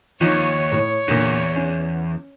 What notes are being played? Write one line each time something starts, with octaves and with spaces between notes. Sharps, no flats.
D#2 F3 D#4 C#5
A2
E2 A#2 D3
C#4